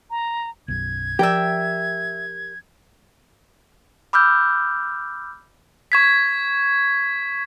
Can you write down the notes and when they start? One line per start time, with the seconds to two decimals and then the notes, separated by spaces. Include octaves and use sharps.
0.10 A#5
0.68 B1 F#2 G#6
1.19 F3 G4 A#4 D5 E5 G5
4.13 B5 D6 E6 F6 G6
5.92 C#6 G#6 B6